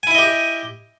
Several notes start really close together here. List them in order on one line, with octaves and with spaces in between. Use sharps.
G#5 E4 E5 D#5 G4